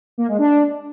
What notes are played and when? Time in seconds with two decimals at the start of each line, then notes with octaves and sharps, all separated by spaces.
0.18 A#3
0.28 G#3
0.39 D4